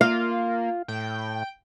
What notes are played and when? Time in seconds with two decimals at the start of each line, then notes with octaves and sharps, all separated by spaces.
0.01 A#3 F4 F5
0.88 A2 G5